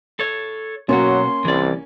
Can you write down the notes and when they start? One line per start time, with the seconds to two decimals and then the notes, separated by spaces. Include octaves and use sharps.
0.20 A4 C#5
0.89 B2 F#3 A#3 C#4 F#4 C6
1.45 C2 E3 D5